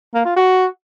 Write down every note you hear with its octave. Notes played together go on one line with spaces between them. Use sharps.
A#3
F4
F#4